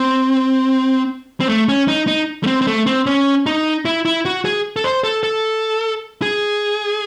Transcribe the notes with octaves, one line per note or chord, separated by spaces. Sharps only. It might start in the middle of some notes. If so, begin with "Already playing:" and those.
Already playing: C4
C4
A3
C#4
D#4
D#4
A3
C4
C4
A3
C4
C#4
D#4
E4
E4
F#4
G#4
A4
C5
A4
A4
G#4